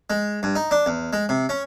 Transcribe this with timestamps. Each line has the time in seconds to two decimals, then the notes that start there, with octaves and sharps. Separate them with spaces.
0.10 G#3
0.43 G2
0.56 D#4
0.71 D4
0.86 E2
1.13 G#3
1.29 C3
1.49 C#4